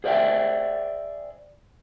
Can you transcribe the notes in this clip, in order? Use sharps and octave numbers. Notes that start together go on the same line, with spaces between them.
G#4 C5 D5 E5 G5